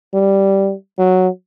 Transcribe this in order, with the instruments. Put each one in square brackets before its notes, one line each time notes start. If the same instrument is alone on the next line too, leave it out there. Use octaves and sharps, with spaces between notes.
[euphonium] G3
F#3